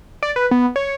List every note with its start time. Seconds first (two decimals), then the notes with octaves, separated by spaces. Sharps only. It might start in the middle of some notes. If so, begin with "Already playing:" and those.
0.23 D5
0.36 B4
0.51 B3
0.76 C#5